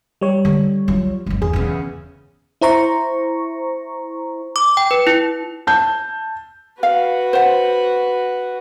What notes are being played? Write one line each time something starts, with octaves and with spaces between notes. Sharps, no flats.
G3 C#5
D3
F#3 F4
G1 C#2
E2 G#4
E2 C#3
E4 C5 A#5 C#6
D6
G5
B4
E4
A5 G6
F#4 B4 F5
C5 F#5